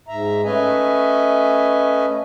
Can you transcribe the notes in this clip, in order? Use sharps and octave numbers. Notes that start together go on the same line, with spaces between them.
G#2 E5 A#5
A3 C#4 B4 D#5 E5 G#5